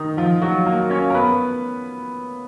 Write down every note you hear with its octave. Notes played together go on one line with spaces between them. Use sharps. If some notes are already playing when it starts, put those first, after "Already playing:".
Already playing: D#3 D#4
F3 F4
F#3 F#4
A#3 A#4
C#4 C#5
A#4
B3 B4